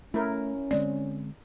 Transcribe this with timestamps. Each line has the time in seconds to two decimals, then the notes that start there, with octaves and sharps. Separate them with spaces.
0.14 A3 C#4 E4 A#4
0.71 D3 G#3 C4 D5